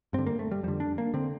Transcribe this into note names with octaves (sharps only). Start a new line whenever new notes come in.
G2 C4
D3
A#3
A3
G3
F2 D3 G3
D4
A#3
D3 C4